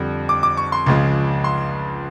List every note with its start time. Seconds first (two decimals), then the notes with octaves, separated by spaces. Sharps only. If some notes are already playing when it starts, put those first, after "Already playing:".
Already playing: F2 D3 G3
0.29 D6
0.43 D6
0.57 C#6
0.72 C6
0.86 C#2 C#3 F3 G#3
1.44 C6